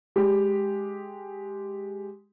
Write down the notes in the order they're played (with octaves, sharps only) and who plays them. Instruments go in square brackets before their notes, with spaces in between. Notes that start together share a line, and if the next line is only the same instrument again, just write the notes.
[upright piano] G#3 G4